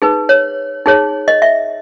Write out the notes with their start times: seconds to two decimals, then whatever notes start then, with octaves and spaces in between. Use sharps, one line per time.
0.02 D#4 G#4 B4
0.29 C#5
0.86 D#4 G#4 C#5
1.28 D#5
1.42 E5